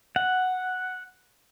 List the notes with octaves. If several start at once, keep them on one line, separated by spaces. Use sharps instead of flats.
F#5